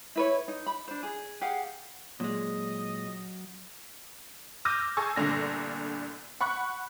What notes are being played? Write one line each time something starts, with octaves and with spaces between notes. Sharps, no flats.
E4 B4 C#5
D#4
B5
D4 C5
G#4
G4 G#4 F5 F#5
A#2 F#3 G#3 D#5
D6 E6 F6 G6 A#6 D#7
G#4 G#5 A5 C#6 E6
G1 C2 A#2 D3 A#6
F#5 B5 C#6 F#6